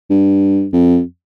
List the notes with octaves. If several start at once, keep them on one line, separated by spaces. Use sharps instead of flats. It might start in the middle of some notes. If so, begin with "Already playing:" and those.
G2
F2